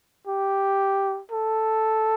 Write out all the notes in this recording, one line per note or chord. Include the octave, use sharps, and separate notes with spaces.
G4
A4